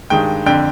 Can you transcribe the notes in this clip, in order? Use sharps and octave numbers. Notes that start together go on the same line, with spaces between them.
G2 D#3 G#3 G5
F2 D3 G5